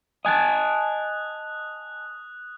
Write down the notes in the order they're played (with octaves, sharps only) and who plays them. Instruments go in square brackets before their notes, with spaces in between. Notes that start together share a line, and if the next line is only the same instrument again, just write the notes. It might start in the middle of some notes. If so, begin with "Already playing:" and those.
[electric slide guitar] D#5 G#5 A5 [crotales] D#6 F#6